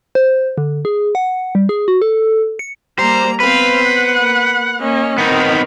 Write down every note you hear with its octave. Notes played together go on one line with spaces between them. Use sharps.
C5
D3
G#4
F#5
G3
G#4
F#4
A4
C#7
G3 A#3 C5 A#5
B3 C4 B4 C5 F5
F#5
A#3
A#3 C#4 D#5
D#3 B3 C4 D#4